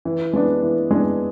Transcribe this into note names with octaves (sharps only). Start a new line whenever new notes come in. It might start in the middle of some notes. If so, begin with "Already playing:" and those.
E3
G#3 B3 D4
E3
G#3 B3 D4